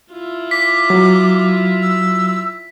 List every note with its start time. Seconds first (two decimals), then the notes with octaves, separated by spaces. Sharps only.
0.13 E4 F4
0.51 D6 B6
0.90 F#3
1.82 E6